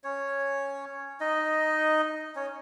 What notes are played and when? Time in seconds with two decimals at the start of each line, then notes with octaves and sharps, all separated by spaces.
0.04 C#4 C#5
1.20 D#4 D#5
2.35 C#4 C#5